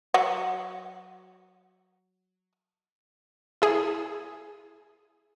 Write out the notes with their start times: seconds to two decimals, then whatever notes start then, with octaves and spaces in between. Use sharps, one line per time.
0.14 F#3 F#5
3.62 E4 G#4